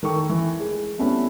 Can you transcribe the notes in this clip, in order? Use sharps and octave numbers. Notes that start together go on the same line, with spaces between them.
D#3 A4 C#6
E3
G#3
G3 A3 B3 C#4 E4